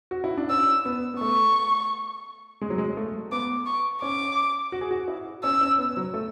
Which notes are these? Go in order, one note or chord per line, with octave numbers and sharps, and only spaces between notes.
F#4
E4
D4
C#4 E6
B3
B3
A3 C#6
G#3
F#3
G#3
A3
B3 D6
C#6
C#4 D6
F#4
G#4
F#4
E4
C#4 E6
C#4
B3
F#3
A3